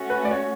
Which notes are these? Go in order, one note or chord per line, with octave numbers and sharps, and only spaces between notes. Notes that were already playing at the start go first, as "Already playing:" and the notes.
Already playing: A3 C#4 F#4
B4
D5
C#5